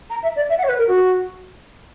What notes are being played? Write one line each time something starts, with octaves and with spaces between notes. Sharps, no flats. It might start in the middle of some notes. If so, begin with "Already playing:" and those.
A#5
E5
D5
E5
F#5
C#5
B4
A#4
F#4